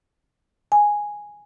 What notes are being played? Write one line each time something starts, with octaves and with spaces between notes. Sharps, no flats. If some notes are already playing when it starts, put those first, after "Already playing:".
G#5